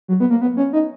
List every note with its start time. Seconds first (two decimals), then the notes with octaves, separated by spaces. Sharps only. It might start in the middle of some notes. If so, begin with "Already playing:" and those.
0.08 F#3
0.20 B3
0.30 A#3
0.41 B3
0.57 C#4
0.73 D#4